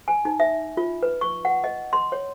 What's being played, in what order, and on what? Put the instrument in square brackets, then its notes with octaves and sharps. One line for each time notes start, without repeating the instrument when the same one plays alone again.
[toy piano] G#5
D#4
E5
F4
B4
C#6
F#5
D#5
C6
C#5